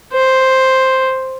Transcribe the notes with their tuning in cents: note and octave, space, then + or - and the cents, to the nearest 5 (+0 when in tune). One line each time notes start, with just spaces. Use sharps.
C5 +5